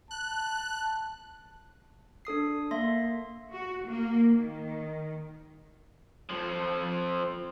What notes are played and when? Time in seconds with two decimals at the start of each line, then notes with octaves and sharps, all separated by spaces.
0.11 A5 F#6
2.25 D4 A4 D#6 C7
2.71 A#3 E5 C6 A#6
3.52 F#4
3.86 A#3
4.31 D#3
6.29 F2 F3